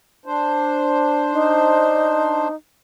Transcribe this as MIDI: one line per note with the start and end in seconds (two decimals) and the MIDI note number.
0.26 2.48 62
0.26 2.48 72
1.33 2.55 63